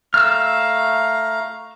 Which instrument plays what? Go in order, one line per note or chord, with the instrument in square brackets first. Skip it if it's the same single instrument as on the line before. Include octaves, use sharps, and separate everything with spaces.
[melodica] A3 F5 A#5 [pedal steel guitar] E6 F6